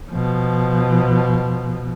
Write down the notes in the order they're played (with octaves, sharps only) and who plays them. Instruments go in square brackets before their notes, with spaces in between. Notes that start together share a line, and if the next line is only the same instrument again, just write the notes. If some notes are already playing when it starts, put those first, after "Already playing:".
[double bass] B2 F3